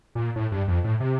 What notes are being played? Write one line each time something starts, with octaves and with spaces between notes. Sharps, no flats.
A#2
A2
G2
F2
A2
C3